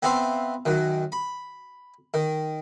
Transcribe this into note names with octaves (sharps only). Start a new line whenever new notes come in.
B3 C4 C5 E5 F5
F#2 D#3
B5
D#3